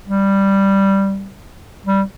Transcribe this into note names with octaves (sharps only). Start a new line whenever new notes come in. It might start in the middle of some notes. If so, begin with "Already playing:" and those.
G3
G3